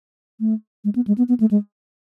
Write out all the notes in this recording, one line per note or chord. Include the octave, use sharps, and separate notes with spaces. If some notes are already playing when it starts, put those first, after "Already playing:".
A3
G#3
B3
G#3
B3
B3
A3
G#3